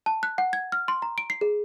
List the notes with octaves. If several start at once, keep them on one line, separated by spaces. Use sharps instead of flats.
A5
F#6
F#5
G#6
F6
C6
A#5
D7
C7
G#4